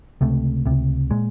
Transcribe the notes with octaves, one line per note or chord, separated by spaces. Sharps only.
C#2 C3 A3
C#2 C3
A#2 G#3